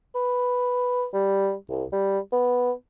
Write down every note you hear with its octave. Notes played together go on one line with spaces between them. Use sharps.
B4
G3
C2
G3
B3